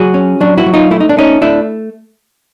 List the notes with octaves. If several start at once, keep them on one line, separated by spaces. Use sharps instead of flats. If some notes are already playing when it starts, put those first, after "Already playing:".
Already playing: F#3 F#4 G#4
C#4
F#3 D4
E4 F#4
F#3
D#4 F4
A3 E4
D#4
D4
A3 C#4 D#4
A3 D4 E4